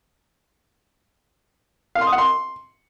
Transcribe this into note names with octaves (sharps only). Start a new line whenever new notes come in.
F5
C6
D#6
F#5
C6